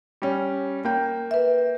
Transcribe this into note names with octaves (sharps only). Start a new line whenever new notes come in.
G3 C#4
A#3 G5
B4 E5